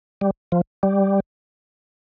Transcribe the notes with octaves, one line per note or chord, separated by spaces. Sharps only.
G3
F3
G3